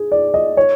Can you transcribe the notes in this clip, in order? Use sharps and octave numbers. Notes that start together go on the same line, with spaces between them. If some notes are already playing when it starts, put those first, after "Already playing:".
Already playing: G#4
D5
D#5
C#5